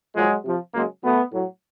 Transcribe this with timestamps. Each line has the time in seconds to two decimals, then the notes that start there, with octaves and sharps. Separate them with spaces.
0.15 A#2 F3 F#3 G#3
0.45 C3 F3
0.74 C#3 F#3 G#3 A#3
1.03 B2 F#3 A3 B3
1.32 A2 F#3